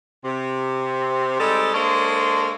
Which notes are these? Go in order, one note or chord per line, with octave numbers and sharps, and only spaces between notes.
C3
G3 G#3 C4 D#4 A4
G#3 A#3 D4 A4 C5 C#5